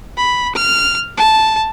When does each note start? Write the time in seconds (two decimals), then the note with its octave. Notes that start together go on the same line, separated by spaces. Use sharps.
0.17 B5
0.55 F6
1.17 A5